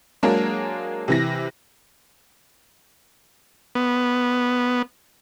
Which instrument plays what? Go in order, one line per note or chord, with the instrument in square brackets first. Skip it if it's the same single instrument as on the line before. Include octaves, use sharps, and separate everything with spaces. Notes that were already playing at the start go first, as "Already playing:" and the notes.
[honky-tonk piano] F#3 G#3 A#3 D4 G#4 A#4
C3 E3 A#6
[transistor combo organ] B3